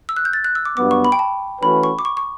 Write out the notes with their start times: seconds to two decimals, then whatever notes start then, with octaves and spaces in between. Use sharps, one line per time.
0.09 E6
0.16 F#6
0.25 G6
0.33 A6
0.44 F#6
0.55 E6
0.65 D6
0.77 G2 F#3 B3 D6
0.91 C#6
1.05 B5
1.12 G5
1.19 A5
1.61 E3 A3 C#4 F#4 B4 B5
1.83 C#6
1.99 D6
2.05 C#6
2.17 C#6